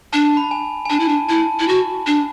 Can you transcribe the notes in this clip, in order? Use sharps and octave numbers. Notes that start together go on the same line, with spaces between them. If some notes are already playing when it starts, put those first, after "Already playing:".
D4 A5
B5
A5
G#5
G#5
D4 A5
E4
D4
E4 A5
E4
F#4
D4